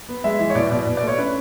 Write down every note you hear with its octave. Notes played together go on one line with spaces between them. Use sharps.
B3
G#3 E5
E3
C#5
B2 D5
B2 D5
B2
D5
A3 C#5
C#4 B4